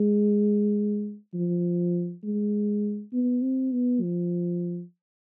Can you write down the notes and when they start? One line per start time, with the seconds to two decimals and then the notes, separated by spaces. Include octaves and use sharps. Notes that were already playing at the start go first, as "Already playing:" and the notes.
Already playing: G#3
1.34 F3
2.23 G#3
3.13 B3
3.42 C4
3.72 B3
4.02 F3